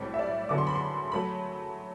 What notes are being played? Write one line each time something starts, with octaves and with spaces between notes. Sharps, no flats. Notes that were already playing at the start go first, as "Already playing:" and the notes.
Already playing: B1 A2 G3 C4
E5
D5
E2 D3 F#3 B3 D6
C6
B5
C6
F#3 A3 B5